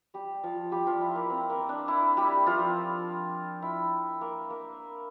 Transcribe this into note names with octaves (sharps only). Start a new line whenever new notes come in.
G3 G4
F3 F4
G3 G4
F3 F4
E4
A#3
C4
A#3
D4
E4
G3 G4
F3 F4
E4
A#3
A#3